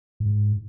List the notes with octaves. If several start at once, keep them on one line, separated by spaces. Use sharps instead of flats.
G#2